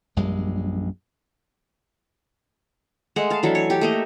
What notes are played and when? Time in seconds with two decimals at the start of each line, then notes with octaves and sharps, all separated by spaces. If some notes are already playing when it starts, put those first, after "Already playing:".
0.16 A#1 F#2 G3 G#3
3.16 G#3 A3 F#5
3.30 F5 A5
3.43 E3 F#3 D4 A4
3.55 C#5
3.70 G4
3.81 A3 A#3 D#5